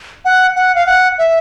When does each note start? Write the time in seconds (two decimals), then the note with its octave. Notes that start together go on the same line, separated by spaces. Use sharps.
0.25 F#5
0.56 F#5
0.75 F5
0.86 F#5
1.18 E5